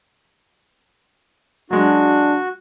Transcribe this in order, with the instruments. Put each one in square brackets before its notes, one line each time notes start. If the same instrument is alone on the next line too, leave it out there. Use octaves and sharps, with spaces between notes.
[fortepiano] F#3 G#3 [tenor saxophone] D4 [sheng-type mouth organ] F#4